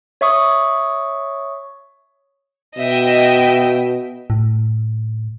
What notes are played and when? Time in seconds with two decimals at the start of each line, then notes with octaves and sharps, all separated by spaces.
0.21 C#5 E5 C#6 D#6
2.78 B2 D#5 E5 G5
4.30 A2